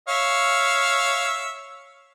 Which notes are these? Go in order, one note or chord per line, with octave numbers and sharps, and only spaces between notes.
C#5 E5 F5